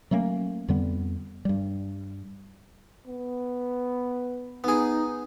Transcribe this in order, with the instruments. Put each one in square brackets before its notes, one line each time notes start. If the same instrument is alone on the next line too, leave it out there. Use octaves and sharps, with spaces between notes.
[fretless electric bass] F#3 A3 A#3 C#4
F2 D3 G3 B3
G2 G3
[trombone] B3
[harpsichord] B3 G#4 [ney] D#4